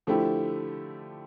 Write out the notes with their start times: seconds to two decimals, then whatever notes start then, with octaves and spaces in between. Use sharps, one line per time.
0.07 D3 F3 A3 E4 G4